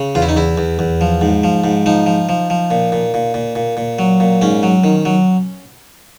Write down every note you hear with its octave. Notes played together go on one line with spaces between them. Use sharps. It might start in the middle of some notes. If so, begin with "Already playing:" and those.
Already playing: C#3
E2 F4
E4
D#4
E2 E4
E2
E2
F3
G#2
F3
G#2
F3 D#4
F3
F3
F3
A#2
A#2
A#2
A#2
A#2
A#2
F#3
A#2
G#2 C#4
F#3
D#3
F#3